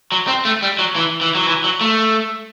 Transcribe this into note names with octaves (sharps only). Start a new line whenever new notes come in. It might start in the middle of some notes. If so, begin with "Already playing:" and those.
F#3
C4
A3
G3
F#3
E3
E3
F#3
E3
F#3
A3